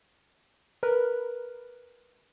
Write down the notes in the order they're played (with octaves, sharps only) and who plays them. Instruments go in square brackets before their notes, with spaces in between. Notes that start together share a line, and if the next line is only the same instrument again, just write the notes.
[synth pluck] A#4 B4